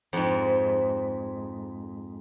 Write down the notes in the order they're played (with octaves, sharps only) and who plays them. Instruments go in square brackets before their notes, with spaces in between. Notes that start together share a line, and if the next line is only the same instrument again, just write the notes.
[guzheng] F2 G#2